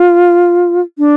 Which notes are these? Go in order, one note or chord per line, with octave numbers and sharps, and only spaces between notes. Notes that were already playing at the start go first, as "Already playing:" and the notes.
Already playing: F4
D4